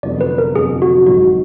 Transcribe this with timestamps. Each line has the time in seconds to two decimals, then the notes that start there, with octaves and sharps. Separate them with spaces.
0.03 F1 F2 D3 F#3 B3 D5
0.21 B4
0.38 A#4
0.55 F1 F2 D3 F#3 B3 G#4
0.82 F#4
1.07 G#1 G#2 F#3 F#4